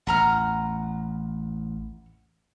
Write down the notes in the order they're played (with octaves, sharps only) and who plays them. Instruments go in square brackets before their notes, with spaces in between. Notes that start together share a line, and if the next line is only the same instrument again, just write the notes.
[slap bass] A1 E2 [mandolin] F#5 A#5 F6